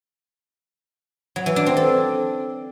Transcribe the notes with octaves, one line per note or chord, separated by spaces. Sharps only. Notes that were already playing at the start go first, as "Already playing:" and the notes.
F#3
E3
D4
C4
A4